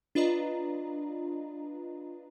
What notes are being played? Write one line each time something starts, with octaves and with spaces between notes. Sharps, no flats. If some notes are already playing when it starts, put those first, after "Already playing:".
D4 F4 B4 D5 D#5 A#5